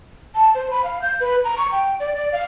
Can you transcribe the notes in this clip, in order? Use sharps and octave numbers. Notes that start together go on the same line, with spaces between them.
A5
C5
B5
F5
G6
B4
A#5
C#6
G5
D5
D5
F5